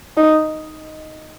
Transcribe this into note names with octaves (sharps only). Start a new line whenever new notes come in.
D#4